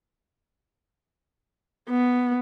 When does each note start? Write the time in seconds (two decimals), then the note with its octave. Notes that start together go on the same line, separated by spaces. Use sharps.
1.90 B3